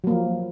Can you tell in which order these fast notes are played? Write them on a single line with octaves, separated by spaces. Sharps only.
F#3 A#3 F3